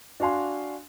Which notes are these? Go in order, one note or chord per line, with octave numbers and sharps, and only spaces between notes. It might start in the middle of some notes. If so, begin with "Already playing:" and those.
D4 F#4 F5 G#5 C6